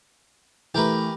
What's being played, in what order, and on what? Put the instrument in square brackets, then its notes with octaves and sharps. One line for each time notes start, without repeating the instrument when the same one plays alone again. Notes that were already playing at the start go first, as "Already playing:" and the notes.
[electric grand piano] E3 A3 [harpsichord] G4 A#4 B4